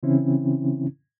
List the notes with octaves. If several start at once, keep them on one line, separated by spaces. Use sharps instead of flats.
C#3 E3 C4 C#4 E4